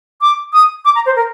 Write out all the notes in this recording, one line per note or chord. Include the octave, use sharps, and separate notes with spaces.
D6
D#6
D6
A#5
C5
A#4